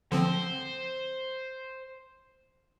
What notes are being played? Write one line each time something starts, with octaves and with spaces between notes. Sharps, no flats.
D3 F3 C4 C5